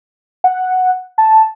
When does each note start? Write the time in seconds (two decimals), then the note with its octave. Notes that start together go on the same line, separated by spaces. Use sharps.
0.44 F#5
1.18 A5